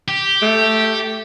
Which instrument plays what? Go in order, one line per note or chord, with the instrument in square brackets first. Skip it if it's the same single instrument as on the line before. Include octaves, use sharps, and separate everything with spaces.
[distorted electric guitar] G4
[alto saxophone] A3